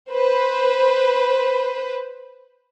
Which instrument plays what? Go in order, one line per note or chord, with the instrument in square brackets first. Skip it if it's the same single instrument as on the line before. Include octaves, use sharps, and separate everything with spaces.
[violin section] B4 C5